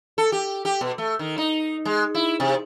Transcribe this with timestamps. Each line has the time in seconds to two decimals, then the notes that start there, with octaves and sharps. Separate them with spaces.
0.18 A4
0.32 G4
0.65 G4
0.81 B2
0.98 A3
1.19 D#3
1.38 D#4
1.85 G#3
2.15 E4
2.40 C3